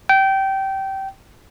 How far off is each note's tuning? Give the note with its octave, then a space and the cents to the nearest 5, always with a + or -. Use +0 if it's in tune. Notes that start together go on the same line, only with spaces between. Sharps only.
G5 -20